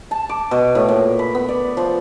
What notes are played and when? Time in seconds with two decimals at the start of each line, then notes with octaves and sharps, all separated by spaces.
0.11 A5
0.29 D6
0.51 B2
0.75 A2
0.88 A#2
1.19 B5
1.35 B3
1.49 D5
1.77 F3